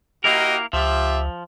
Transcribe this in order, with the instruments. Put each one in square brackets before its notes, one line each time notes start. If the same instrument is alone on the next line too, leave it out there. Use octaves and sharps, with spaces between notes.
[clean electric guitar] A#3 E4 A#4 [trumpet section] F#4 G4 D#5
[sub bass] C#2 [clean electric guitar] F3 [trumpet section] F4 G4 E5